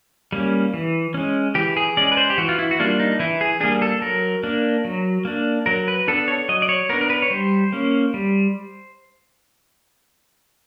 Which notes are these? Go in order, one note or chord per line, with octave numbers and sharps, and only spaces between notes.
G3 A#3 C#4
E3
G#3 C#4
E3 G4
G#4
G#3 C#4 D5
B4
C5
G4
E3 F#4
F4
E4
F#4
G3 A#3 D4 F4
D#4
E3 E4
G#4
G3 A#3 D4 G#4
A4
F#3 A#4
A#3 D4
F#3
A#3 D4
F#3 A#4
B4
B3 D4 A4
C#5
F#3 D#5
D5
C#5
B3 D4 A#4
A#4
B4
C#5
G3 C5
A#3 C#4
G3